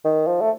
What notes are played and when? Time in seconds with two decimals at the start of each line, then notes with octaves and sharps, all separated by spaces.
0.05 D#3
0.27 F3
0.41 A3